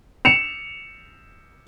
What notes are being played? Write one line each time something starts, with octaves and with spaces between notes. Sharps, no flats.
C#7 E7 F7